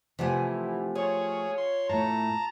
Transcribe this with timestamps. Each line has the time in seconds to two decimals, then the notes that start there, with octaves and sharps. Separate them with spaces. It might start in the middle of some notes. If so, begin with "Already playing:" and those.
0.19 C3 E3 F3 A3 G4 F#5 G#5
0.95 F4 G#4 C#5
1.58 C6
1.89 A2 A3 A5 A#5